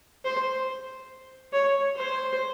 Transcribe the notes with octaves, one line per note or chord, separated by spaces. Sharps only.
C5
C#5
C5